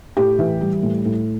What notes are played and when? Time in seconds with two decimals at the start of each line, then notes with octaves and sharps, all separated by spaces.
0.17 A2 G4
0.39 E3
0.61 G3
0.82 A2
1.05 A2